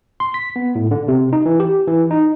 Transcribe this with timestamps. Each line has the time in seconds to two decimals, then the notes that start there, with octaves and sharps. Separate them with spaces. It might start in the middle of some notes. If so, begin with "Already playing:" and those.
0.20 C6
0.34 B6
0.56 B3
0.75 A2
0.91 D3
1.08 C3
1.33 D#4
1.46 E3
1.60 G4
1.87 E3
2.11 D#4